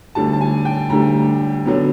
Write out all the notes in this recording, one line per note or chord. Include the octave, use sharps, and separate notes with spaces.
D2 D3 G3 A5
A5
G#5
G5
D2 D3 G3 A#5
D3 F#3 B3